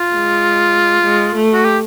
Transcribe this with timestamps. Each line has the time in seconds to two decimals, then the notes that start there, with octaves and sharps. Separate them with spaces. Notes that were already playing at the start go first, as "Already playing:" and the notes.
Already playing: F4
0.14 G#3
1.04 G#3
1.35 A3
1.53 F#4
1.65 G4